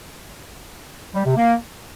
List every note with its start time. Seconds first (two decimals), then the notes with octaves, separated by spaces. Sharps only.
1.15 G3
1.26 C3
1.37 A#3